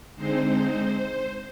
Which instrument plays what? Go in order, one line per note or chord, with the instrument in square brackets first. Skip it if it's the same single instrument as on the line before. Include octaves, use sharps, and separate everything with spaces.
[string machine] D3 G#3 C4 D#4 C5